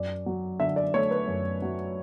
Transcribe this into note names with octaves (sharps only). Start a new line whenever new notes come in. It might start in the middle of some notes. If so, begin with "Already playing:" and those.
Already playing: F#2 D5
F#3
D3 E5
D5
A3 C#5
B4
F#2
F#3